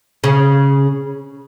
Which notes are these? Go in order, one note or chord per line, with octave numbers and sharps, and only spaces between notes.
C#3